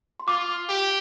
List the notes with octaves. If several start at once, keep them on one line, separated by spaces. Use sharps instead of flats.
C6
F4 D6
G4